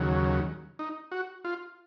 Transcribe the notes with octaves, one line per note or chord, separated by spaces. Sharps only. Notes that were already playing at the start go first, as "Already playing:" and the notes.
Already playing: D#2 C#3 F#3
D#4
F#4
F4